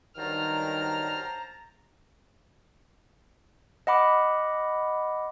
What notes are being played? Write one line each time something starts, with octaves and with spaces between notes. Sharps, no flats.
G2 D#3 F#3 G3 C5 A5 A#5 F6
D#5 F#5 B5 D6